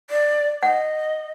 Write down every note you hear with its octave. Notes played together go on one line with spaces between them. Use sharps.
D5
D#5 F#5